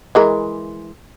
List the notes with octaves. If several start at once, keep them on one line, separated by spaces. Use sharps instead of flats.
E3 G#3 A#4